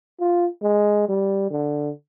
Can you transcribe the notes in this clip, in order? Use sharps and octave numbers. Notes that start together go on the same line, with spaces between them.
F4
G#3
G3
D3